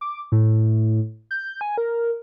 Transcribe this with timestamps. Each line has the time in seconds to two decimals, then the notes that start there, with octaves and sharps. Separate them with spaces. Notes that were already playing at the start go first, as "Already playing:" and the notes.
0.01 D6
0.32 A2
1.31 G6
1.61 G#5
1.78 A#4